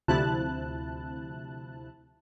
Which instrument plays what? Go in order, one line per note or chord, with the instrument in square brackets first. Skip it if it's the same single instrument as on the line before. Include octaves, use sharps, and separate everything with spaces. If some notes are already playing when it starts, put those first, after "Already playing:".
[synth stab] D2 C3 F3 E4 A5 F#6